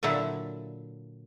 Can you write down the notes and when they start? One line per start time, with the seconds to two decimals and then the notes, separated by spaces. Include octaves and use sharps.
0.03 A#2 D3 F#3 E4 E5